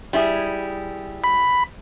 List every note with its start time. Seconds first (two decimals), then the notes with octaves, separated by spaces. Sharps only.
0.13 G3 E4 G#4
1.24 B5